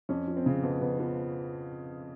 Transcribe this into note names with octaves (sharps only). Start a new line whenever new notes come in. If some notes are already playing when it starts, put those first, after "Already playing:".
F2 C#4
F3
C4
C#3
F2 B3
F2 B3
F3 B3